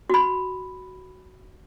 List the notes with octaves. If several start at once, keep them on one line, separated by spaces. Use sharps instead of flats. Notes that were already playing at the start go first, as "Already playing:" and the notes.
F#4 B5